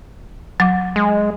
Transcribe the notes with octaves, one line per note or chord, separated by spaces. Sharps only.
F#3 D6
G#3